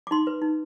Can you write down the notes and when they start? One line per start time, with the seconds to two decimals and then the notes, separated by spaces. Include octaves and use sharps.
0.07 D6
0.11 D#4 C6
0.27 B4
0.42 D#4